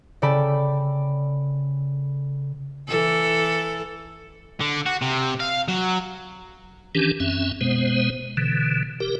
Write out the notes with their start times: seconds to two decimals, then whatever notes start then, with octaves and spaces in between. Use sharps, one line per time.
0.22 C#3 A4 D5 G5 B5
2.88 E3 A4
4.60 D3
4.86 F#4
5.02 C3
5.40 F5
5.68 F#3
6.95 D#3 E3 C#4 D4 G4
7.20 F#2 C4 C#4 E5
7.61 B2 G#3 B3 C5
8.37 B2 D3 E3
9.00 G4 A#4